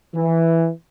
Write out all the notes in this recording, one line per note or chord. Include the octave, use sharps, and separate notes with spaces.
E3